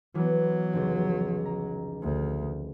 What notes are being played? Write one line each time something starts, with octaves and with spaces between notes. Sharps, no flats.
E3 F#3 B3
F1 C#2
A#5
D2